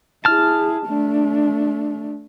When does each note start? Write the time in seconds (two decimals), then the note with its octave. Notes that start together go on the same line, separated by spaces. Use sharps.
0.25 E4 G#4 A5 F6
0.87 A3 D4